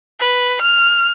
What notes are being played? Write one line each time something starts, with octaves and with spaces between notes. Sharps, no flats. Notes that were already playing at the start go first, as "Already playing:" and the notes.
B4
F6